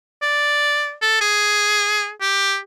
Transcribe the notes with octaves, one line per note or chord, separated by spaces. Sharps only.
D5
A4
G#4
G4